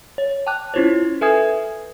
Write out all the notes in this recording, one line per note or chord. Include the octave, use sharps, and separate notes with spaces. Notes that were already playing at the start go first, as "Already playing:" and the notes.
C#5
G5 A5 D6 F#6
C#4 E4 F4 C5 C#5
A4 B4 E5 G#5 D#6 G#6